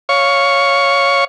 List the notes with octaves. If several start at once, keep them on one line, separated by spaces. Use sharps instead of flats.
C#5 F5 C#6